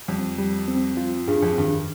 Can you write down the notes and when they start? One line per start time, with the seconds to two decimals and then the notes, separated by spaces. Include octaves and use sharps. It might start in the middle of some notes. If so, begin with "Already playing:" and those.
0.08 F2 G3
0.38 G3
0.68 C4
0.97 F4
1.28 G2 G#4
1.42 F2
1.58 G2 D#3